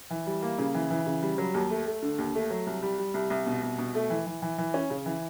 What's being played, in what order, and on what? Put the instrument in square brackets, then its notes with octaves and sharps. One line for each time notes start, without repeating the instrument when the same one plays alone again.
[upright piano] E3
G3
A#3
C#3
E3
E3
C#3
G3
F#3
D#2
A3
A3
D3
D#2
A3
F#3
C2
G3
G3
C2
C2
B2
C2
B2
A3
E3
E3
E3
E3
C#4
C#3
E3